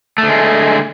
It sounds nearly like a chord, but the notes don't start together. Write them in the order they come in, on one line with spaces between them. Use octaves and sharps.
A3 D3 G#3